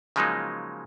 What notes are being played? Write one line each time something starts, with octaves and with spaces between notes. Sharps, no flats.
C#3 F3 F#3 G#3 A#3 D#4